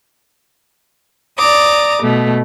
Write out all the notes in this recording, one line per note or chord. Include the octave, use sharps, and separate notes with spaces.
D5 A#5 D6 D#6
B2 A3